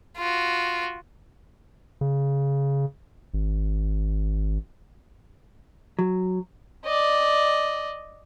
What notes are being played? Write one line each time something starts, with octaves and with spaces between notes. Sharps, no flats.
F4 F#4
C#3
G#1
F#3
D5 D#5